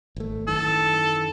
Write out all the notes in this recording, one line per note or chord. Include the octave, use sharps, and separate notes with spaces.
G#1 A3
F#2 D#3 E3 A4